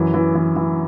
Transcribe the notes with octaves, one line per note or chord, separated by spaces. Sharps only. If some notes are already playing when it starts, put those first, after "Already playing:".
Already playing: F#2 E3
E3
E3
E3